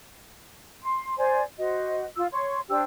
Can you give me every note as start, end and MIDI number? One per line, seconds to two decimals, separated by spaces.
0.83 1.18 84
1.18 1.43 72
1.18 1.43 74
1.18 1.43 80
1.58 2.05 66
1.58 2.05 72
1.58 2.05 75
2.16 2.27 65
2.16 2.27 88
2.33 2.60 73
2.33 2.60 84
2.33 2.60 85
2.70 2.83 62
2.70 2.83 67
2.70 2.83 72
2.70 2.83 88